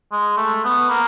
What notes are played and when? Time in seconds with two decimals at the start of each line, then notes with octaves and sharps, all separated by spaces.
0.12 G#3
0.37 A3
0.64 B3
0.90 A#3